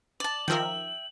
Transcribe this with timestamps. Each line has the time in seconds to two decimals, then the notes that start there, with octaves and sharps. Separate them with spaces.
0.20 D5 A5 F#7
0.48 D#3 F3 A#4 E5 G5